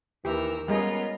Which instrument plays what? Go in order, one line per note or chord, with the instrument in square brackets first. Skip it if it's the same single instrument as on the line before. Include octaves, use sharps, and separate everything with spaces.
[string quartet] D#2 A#4 E6 [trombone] E3 [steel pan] G4
[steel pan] G3 G#3 G#4 [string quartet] B3 C#4 F4 [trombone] A#4 [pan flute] D#5